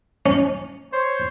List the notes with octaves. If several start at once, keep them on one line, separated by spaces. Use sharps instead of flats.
C#4
C5 C#5